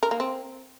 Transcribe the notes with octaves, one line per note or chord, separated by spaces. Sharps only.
A#4
A#3
C4